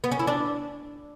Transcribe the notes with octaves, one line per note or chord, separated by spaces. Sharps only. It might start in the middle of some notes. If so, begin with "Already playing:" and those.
B3
C#4
E4
D4